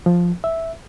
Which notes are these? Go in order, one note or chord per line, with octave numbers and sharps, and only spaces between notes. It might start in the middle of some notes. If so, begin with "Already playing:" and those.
F3
E5